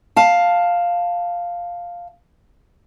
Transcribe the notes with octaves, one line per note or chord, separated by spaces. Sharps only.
F5 A5